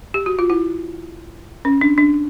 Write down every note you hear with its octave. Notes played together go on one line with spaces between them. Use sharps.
G4
F#4
F4
E4
C#4
D4
D4